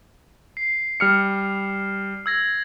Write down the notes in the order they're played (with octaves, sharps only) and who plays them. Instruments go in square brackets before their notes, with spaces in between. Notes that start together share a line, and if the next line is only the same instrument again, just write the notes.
[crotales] C7
[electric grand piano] G3 F6 C#7
[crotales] E6 G#6 A#6